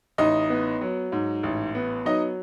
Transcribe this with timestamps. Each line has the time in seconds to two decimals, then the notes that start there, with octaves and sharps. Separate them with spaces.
0.18 A1 D#4 D#5
0.50 B3
0.81 F#3
1.12 G#2
1.43 A1
1.75 B3
2.05 F#3 D#4 D#5